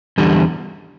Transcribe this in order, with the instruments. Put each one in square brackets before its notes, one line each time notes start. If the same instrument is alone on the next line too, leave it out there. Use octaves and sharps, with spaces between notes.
[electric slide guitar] E2 D3 G3